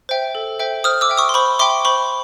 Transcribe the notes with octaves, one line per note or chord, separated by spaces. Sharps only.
C5 E5 G5
A4
C5 E5 G5
C5 D#6 F6
D6 E6
E5 G5
C#6 D#6
C6
C5 B5 C#6
E5 G5 C6 D6
C5 B5 C#6